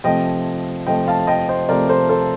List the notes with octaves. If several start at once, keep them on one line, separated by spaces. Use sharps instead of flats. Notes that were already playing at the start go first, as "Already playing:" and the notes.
C3 F3 A3 D#5 G5
C3 F3 A3 D#5 G5
F5 A5
D#5 G5
C5 D#5
C3 F3 A3 A#4 D5
A4 C5
A4 C5